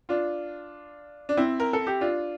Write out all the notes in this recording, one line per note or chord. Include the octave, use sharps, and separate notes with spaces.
D4 F4
D4
C4 E4
A#4
A4
G4
D4 F4